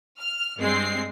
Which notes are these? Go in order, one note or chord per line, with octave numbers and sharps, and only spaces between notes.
F6
G2 G#3 C4 C7